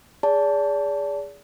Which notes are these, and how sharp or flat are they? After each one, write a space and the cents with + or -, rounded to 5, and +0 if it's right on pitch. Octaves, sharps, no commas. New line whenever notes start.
G#4 -15 D5 -35 A5 +0